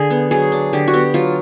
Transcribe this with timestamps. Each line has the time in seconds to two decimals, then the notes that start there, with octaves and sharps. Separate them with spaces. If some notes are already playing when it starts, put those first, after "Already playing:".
Already playing: D3 G#4
0.11 B3
0.31 F#3 G#4
0.52 D4
0.73 D3 G4
0.88 F#4
0.94 B3 G4
1.14 F#3 F4